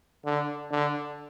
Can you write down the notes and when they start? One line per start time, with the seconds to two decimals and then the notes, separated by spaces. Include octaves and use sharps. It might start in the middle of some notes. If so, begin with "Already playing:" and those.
0.25 D3
0.71 D3